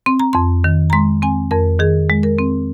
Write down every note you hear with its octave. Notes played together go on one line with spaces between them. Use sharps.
C4 C6
A#5
F2 C6
D#3
A#5
G#3 C6
C4 G#5
F2 A#4
D#3 G#4
G#3
A#4
C4